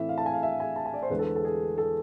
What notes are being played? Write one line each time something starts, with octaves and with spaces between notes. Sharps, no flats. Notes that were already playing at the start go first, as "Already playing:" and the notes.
Already playing: A2 E3 A3 C4 E5
F5
A5
G#5
F5
E5
G#5
A5
G#5
D5
C5
E2 D3 G#3 B4
A4
A4
G#4
A4